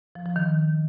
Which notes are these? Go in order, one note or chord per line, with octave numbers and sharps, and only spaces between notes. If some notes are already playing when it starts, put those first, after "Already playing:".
F3
F3
D#3